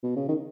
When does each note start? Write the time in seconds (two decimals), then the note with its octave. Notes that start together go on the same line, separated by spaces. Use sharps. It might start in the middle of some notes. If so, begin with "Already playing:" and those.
0.03 B2
0.16 C#3
0.29 D#3